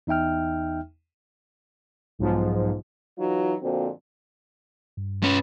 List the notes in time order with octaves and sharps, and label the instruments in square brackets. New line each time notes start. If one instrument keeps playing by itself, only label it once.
[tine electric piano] E2 D#4 E5 G5 F6
[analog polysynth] B1 G#2 F3
[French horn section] E3 F#3 D#4 F4 F#4
F2 A#2 D3 C4 F#4
[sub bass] G2
[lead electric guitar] C#4 B4